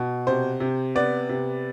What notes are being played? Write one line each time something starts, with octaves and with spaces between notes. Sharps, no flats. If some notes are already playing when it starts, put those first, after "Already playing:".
Already playing: B2
C3 C5
C3
B3 D5
C3